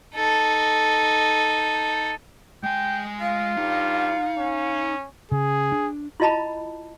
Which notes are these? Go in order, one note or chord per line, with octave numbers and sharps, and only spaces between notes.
D#4 A4
G#3 G5 G#5
F4 F5
G2 D#4
C#4
C#3 G#4
D4
E4 F4 D#5 A5 B5